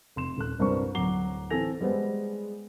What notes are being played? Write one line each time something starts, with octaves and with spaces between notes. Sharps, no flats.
F1 C6 E7
D#1 A4 F#6
C2 G2 A#4 C5 C#6
D1 F#3 A#5 D6 C7 G7
E3 C4 A4 G#5 A#6 F7
G3 G#3 B3 C5